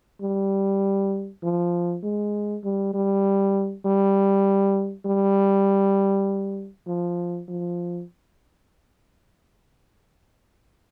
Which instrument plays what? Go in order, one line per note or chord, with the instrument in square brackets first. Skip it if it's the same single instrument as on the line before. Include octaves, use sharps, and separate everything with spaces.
[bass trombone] G3
F3
G#3
G3
G3
G3
G3
F3
F3